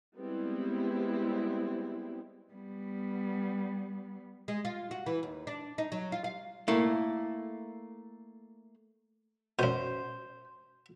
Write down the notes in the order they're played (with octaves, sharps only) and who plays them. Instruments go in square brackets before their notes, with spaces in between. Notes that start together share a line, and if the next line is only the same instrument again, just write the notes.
[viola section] G3 G#3 B3 C4 E4
[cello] G3 B3
[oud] G#3
F4
F#4
E3
D#2
D4
D#4
F#3
F4
F5
[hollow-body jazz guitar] A3 A#3 E4
[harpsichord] F#2 B2 [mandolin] C5